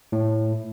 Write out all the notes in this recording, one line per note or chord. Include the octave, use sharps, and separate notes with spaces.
A2